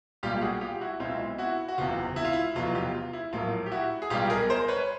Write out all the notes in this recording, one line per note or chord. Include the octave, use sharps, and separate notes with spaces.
B1 A#2 G3 F4 G4
F#4 G#4
F4 G4
E4 F#4
B1 B2 G#3 C4 E4 F4
E4 F#4
F#4
F#1 E2 C3 F4
E4
F4
E4
F1 E2 B2 F#3 F4
F4 G4
F4
E4
A#1 A2 F#3 A#3 F4
G4
E4 F#4
G#4
B1 B2 G3 F4 G4
G#4 A#4
A#4 C5
B4 C#5